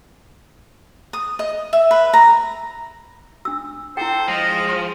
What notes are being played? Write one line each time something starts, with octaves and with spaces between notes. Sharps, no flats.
D#6
D#5
E5
B4
A#5
D4 E6
E4 A4 C5 G5
F3 G#3 D#5